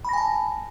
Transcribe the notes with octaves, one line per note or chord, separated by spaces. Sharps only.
G#5 A5 B5 A#6